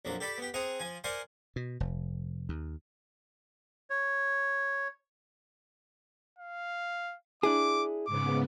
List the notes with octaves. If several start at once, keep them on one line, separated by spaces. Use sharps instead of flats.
A#1 F2 F#3 D6
G4 A4 D5 B5 D6
B3 G4
C4 G#4 F#5 A#5 D#6
F3 G#5
A#4 C5 D5 F#5 G#5 C6
B2
F1
D#2
C#5
F5
D4 E4 G#4 D6
G#2 C#3 B3 D6